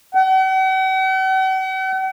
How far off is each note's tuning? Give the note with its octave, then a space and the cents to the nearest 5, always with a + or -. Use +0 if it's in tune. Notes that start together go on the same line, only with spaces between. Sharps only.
F#5 +45